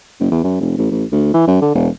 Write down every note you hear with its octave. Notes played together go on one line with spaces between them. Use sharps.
F#1
E2
F#2
F1
A1
A1
D2
E3
F#2
D3
E1